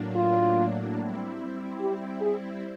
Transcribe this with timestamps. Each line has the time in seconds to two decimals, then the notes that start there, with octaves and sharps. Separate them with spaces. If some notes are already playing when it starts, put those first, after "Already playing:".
Already playing: A2 F#3 A#3 D4
0.16 F4
0.97 G3 C4 E4
1.80 G4
2.21 G#4